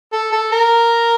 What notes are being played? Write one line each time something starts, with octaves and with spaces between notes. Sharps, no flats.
A4
A4
A#4